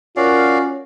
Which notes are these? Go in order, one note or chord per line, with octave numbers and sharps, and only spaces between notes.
C#4 F4 F#4 A#4 D5 F5